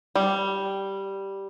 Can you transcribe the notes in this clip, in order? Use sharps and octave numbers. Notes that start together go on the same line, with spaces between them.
G3